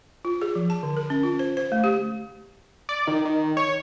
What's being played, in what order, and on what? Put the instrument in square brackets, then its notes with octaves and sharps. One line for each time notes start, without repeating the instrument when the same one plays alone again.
[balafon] F4
G#4
F3
A5
D3
A#4
C#4
F4
C5
C5
A3
G4
[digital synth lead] D5
D#3
D#3
C#5